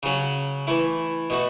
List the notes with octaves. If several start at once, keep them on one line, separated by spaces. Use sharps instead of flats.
C#3 F#3 C#4 F#4
E3 A3 E4
B2 A3 F#4